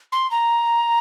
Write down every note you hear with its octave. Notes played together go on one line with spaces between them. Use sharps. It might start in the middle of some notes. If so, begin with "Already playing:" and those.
C6
A#5